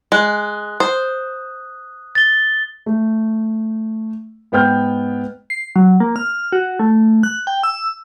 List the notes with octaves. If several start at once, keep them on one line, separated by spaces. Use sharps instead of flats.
G#3 F#6
C5 D#6
A6 G7
A3
G#2 B3 G5 F6 G6
C7
F#3
A#3
F6
F#4
A3
F#6
G5
E6